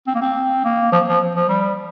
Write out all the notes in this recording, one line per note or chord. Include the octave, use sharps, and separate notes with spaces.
C4
A#3
C4
A#3
F3
F3
F3
G3